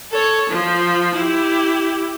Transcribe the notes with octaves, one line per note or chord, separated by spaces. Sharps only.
A4 C#5
F3
E4 G4